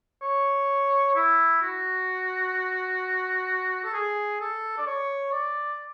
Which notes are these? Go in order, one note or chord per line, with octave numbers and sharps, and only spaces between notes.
C#5
E4
F#4
A4
G#4
A4
D5
C#5
D5